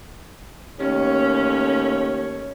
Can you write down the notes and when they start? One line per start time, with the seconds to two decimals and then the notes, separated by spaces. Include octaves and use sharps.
0.79 D#2 A3 C#4 C#5